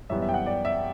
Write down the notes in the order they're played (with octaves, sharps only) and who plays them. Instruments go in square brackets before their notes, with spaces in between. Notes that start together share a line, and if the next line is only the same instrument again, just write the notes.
[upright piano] F#2 E3 G3 B3 E5
E5
G5
F#5
D5
E5